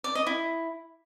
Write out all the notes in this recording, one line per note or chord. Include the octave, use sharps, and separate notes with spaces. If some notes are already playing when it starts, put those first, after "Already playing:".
D5
D#5
E4